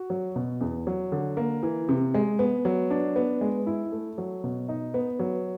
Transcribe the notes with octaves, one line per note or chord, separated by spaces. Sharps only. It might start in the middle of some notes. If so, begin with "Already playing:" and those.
Already playing: F#4
F#3
B2
E2
F#3
D3
A#3
E3
C3
G#3
B3
F#3
D4
B3
G#3
E4
A3
F#3
B2
D#4
B3
F#3